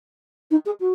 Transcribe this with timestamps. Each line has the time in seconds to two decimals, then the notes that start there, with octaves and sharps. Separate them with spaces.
0.51 D#4
0.65 G#4
0.80 F#4